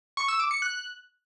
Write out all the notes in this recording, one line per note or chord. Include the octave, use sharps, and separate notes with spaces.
C#6
E6
D6
C#7
F#6